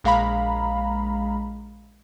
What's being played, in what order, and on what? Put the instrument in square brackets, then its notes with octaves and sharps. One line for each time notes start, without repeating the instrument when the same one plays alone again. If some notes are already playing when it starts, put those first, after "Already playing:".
[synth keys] A#1 G#3 F5 A#5 B5